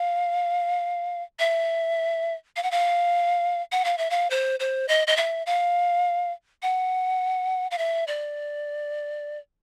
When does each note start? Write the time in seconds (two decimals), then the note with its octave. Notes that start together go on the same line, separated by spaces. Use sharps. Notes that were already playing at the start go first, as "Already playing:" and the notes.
Already playing: F5
1.39 E5
2.56 F5
2.63 F#5
2.71 F5
3.72 F#5
3.85 F5
3.98 E5
4.10 F5
4.30 C5
4.60 C5
4.88 D#5
5.07 D#5
5.17 E5
5.46 F5
6.62 F#5
7.71 F5
7.78 E5
8.07 D5